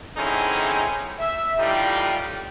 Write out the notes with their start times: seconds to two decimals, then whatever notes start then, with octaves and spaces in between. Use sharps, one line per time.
0.17 D3 C4 C#4 D#4 E4 G#4
1.19 E5
1.59 A2 E3 G3 D#4 F4 G4